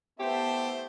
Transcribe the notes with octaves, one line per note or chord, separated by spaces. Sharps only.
A3 B3 E4 G4 C5 E5 A5